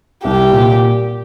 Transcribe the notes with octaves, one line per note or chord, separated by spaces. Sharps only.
C2 G4
A#2